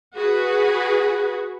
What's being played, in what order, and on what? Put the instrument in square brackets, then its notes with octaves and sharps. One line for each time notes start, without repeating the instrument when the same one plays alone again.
[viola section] F#4 G#4 B4